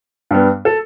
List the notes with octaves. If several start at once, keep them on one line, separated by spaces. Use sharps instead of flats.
G2 G3 B3
A4